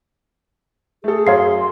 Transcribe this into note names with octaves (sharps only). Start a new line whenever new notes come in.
A3 G#4 A4
F#2 C#5 F5 C6 C7